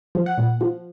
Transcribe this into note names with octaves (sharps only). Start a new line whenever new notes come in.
F3
F#5
A#2
F3